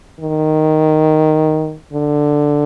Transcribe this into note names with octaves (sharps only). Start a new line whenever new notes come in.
D#3
D3